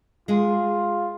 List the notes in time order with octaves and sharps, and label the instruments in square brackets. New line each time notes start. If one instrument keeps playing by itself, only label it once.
[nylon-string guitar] G#3 G#4 [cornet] F4